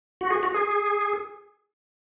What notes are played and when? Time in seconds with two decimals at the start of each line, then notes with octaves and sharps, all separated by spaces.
0.21 F#4
0.30 G#4
0.43 F#4
0.54 G#4